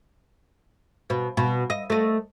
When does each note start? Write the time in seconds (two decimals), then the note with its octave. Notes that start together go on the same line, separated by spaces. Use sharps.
1.10 B2
1.37 B2
1.70 D#5
1.90 A3 D#5